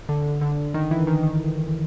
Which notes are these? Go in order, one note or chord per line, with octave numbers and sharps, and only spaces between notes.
D3
D3
D#3
E3
D#3
D#3